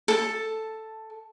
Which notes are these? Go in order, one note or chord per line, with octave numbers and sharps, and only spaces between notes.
A4 A5